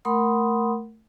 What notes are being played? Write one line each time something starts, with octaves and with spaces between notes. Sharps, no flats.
A3 A#4 F#5 B5 C6 D#6